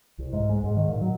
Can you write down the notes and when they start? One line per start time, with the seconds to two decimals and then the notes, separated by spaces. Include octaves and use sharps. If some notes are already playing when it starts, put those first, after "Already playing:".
0.18 C2
0.33 G#2
0.49 G#3
0.64 G#2
0.76 D#3
0.89 A#2
1.01 F#3